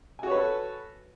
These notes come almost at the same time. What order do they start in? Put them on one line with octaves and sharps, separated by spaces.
G#5 F#4 C#5 B4 A4